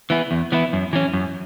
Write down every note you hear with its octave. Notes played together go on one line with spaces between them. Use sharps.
E3 B3 E4
E2
E3 B3 E4
F#2
E3 C#4
F#2